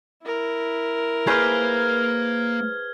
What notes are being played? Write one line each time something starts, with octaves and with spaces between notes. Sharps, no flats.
E4 A#4
A#3 G#4 B4 C5 F6 G#6